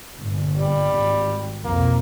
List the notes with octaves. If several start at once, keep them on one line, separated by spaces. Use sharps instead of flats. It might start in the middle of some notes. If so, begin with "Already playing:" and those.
G1 A#2
G3
G#1
B1 F2 A#3